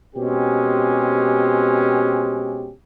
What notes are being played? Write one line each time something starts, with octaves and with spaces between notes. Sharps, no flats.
B2 G#3 C4 C#4 G4